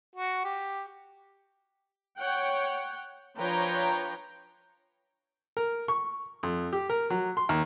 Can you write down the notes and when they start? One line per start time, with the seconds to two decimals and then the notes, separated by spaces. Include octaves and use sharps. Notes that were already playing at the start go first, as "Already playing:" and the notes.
0.16 F#4
0.45 G4
2.19 C#5 F#5 G5
3.37 F3 D4 B4 C#5 G5 A#5
5.57 A#4
5.88 C#6
6.43 F2
6.73 G4
6.90 A#4
7.10 F#3
7.37 C6
7.49 D#2